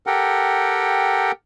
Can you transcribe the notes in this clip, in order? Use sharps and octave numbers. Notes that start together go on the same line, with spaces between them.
G4 A4 A#4 F#5 G5